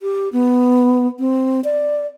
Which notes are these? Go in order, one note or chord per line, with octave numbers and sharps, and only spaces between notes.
G4
B3
C4
D5